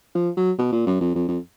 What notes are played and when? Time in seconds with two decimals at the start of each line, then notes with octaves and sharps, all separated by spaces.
0.15 F3
0.37 F#3
0.58 B2
0.72 A#2
0.87 F#2
1.01 F2
1.15 F2
1.28 F2